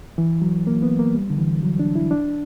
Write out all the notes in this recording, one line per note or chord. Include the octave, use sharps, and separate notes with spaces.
E3
F#3
A#3
B3
A#3
G3
D3
E3
F#3
D4
E4
D4